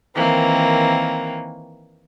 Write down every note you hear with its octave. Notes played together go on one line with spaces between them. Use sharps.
D#3 E3 A#3 C4